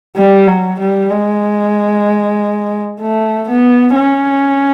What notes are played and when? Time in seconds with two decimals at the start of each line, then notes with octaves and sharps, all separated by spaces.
0.16 G3
0.47 F#3
0.80 G3
1.11 G#3
3.01 A3
3.49 B3
3.96 C#4